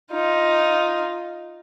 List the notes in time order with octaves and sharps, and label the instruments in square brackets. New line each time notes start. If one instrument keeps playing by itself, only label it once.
[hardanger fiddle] D#4 F4